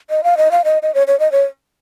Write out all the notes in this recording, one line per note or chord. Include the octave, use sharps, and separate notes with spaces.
D#5
F5
D#5
F5
D#5
D#5
C#5
C#5
D#5
C#5